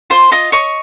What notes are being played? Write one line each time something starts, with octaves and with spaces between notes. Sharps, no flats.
F4 C5 C6
F4 D#5 D#6
C#5 D#5 C#6